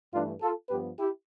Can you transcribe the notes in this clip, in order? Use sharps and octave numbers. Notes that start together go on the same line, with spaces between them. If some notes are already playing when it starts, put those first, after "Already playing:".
G2 E3 A3 D4 F4
F4 A4
G2 F3 B3 G4 B4
E4 G4